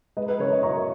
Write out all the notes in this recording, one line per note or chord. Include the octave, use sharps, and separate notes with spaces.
G#3 B4 D#5
B4
C#3 A#4 C#5
B4 D#5
F#2 A#5 C#6